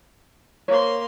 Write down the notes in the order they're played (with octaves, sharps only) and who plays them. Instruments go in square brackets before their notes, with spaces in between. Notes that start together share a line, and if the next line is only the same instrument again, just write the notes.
[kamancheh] A#3 C6 [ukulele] C5 C#5